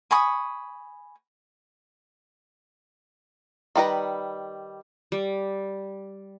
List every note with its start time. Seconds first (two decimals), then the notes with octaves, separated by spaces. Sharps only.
0.11 G#5 B5 C#6 D#6
3.76 D#3 G3 B4 A#5
5.12 G3